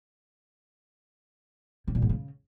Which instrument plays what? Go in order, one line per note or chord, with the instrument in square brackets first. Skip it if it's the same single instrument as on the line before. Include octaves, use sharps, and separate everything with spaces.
[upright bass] C3
A#2
G#2
C#3